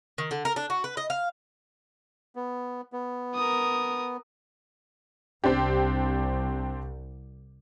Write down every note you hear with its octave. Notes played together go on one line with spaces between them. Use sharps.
D#3
D3
A#4
D4
F#4
B4
D#5
F5
B3
B3
A#4 D#6
C2 C4 D4 G4